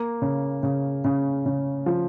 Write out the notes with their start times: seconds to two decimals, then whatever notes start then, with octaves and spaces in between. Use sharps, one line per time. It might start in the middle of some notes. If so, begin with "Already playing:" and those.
Already playing: A#3
0.22 C#3
0.63 C#3
1.04 C#3
1.46 C#3
1.86 F3